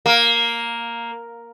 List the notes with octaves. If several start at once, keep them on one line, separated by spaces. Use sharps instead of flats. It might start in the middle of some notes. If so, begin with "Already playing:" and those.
A#3